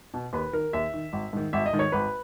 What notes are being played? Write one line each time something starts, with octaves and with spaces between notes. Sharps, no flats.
B2
D#2 B4
D#3 A#4
D#2 E5
D#3
G#1
G#2 D#3
G#1 E5
D#5
G#2 D#3
C#5
G#1 B4